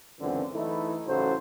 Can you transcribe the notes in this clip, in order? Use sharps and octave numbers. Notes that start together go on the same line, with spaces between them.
C#2 F#2 D3 E3 C4
E3 A3 D#4 E4
A1 C#3 F#3 A4 C5